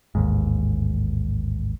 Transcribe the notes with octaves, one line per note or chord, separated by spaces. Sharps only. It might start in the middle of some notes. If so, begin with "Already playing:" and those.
A1 D#2 G#2